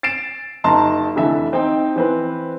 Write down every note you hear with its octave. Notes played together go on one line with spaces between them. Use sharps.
A6 C7 D7 E7
F#1 D#4 A5 A#5 C6
F1 D3 E3 A4 E5
C4 D#4 G5
E3 C4 B4